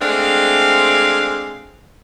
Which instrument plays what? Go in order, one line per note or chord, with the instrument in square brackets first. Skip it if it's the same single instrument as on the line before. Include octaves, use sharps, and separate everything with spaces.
[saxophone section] G#3 A3 C4 D4 F5